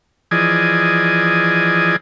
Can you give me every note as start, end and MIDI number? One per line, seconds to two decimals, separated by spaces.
0.31 1.96 52
0.31 1.96 53
0.31 1.96 68
0.31 1.96 74
0.31 1.96 75
0.31 1.96 80